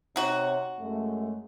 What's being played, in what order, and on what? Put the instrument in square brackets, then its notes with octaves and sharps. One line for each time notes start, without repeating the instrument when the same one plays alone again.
[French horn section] C3 C#5 [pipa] D#4 F#4
[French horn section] F#2 G#3 A3